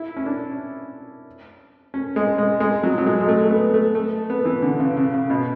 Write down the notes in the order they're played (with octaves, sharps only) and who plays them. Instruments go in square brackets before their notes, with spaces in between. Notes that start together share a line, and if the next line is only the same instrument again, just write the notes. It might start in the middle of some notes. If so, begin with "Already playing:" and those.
Already playing: [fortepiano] E4
C#4
D4
C#4
G#3
G#3
G#3
F#3
F#3
G#3
G#3
A3
A3
B3
A3
A3
B3
E3
D3
C#3
C#3
C#3
B2